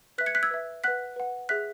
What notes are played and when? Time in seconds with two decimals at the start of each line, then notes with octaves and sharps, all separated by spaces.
0.18 B4 E5 F#6 B6
0.26 G#6 C#7
0.35 F#6 B6
0.43 E6 G#6
0.51 B4 E5
0.84 B4 F#5 F#6 B6
1.16 B4 F#5
1.49 G#4 E5 F#6 B6